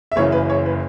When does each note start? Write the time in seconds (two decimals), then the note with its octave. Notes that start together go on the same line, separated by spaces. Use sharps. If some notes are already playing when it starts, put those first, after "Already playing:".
0.12 E5
0.16 F#1 F#2 C#3 E3 C#5
0.32 B4
0.50 C#5
0.66 B4